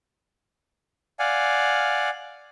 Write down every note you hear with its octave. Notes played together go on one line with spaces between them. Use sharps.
D5 F5 F#5 G#5